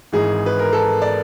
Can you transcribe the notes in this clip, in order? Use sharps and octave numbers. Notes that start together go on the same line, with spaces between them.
G#1 G#2 E3 G#3 G#4
B4
A#4
A4
D5